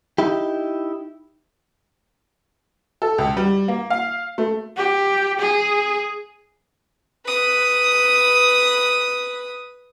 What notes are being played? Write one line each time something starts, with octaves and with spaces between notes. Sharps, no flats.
D#4 E4 G4
A4
C#2
G3
A#3
F5
A3
G4
G#4
B4 D#6